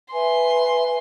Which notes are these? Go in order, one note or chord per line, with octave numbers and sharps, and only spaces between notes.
B4 E5 G#5 C6